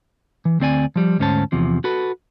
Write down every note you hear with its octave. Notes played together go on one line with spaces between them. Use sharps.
E3
D2 C4 D5 G#5
F3 G3
D2 G#2 C#4 C5 A5
E2 C3 F3
F#4 A4 B4